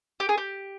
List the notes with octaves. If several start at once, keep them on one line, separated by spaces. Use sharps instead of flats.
G4
G#4
G4